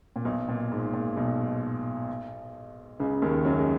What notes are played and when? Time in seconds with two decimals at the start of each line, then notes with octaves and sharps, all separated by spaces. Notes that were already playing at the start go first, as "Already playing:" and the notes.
0.16 A#2
0.25 B1 B2
0.48 A#2
0.72 G#2
0.93 A#2
1.17 B1 B2
3.00 C#2 C#3
3.22 D#2 D#3
3.45 F#2 F#3
3.59 G#3